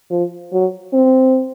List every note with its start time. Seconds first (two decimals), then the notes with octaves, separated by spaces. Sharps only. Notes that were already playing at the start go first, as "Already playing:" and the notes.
0.11 F3
0.52 F#3
0.93 C4